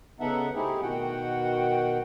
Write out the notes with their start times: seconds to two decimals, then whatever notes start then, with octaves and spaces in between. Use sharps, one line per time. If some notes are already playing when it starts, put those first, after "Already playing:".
0.20 C#3 B3 D#4 A4 E5 F#5
0.55 A3 C4 D#4 E4 G4 G#4
0.82 B2 D#3 F#4 F#5 G5